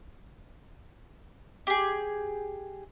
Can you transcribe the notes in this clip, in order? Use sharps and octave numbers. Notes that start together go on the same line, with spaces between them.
G4 G#4